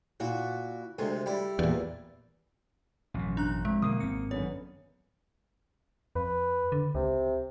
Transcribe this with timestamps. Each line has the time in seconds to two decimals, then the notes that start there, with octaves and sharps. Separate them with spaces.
0.20 A#2 E4 F#4
0.98 D2 C3 G#3 A3
1.26 G3 E4
1.59 E2 A#2 D5
3.14 A1 F#2 B2
3.37 D4 A#5 F#6
3.65 F2 G#3
3.82 B2 D3 F#3 A#3 D#6
4.00 G#1 C4 C#7
4.31 F#2 D3 B3 C#5
6.15 F2 B4
6.72 D3
6.95 C#2 C3